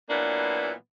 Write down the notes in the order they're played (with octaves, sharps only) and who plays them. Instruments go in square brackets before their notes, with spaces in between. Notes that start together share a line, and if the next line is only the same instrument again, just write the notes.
[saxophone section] A#2 E3 F#3 A#3 B3 D4